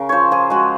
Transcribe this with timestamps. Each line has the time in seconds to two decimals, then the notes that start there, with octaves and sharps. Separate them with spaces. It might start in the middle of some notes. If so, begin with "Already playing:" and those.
Already playing: C#3 A#4
0.09 F3 C5 C#5
0.31 F3 G#4
0.50 G#3 F#4